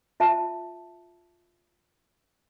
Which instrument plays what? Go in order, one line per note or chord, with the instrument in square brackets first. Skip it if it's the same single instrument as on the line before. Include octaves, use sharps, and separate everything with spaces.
[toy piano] F4 E5 A5